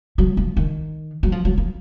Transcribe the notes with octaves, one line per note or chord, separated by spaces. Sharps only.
F#3
F3
D#3
F#3
F3
F#3
F3